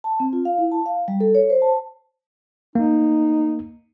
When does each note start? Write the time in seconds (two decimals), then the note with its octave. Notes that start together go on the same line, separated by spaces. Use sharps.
0.04 A5
0.20 C4
0.33 F4
0.45 F5
0.58 E4
0.72 A5
0.86 F5
1.08 G3
1.20 A4
1.35 C#5
1.50 C5
1.62 A5
2.75 A#3 D#4